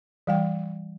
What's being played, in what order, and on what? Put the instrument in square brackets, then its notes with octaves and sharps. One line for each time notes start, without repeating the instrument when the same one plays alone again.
[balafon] E3 G3 G5